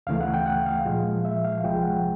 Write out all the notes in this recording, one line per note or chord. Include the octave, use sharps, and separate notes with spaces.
D2 C#3 E3 A3 F5
F#5
G5
F#5
F5
A#2 F3 G#3
E5
F5
C2 C3 F3 G#3 G5
F#5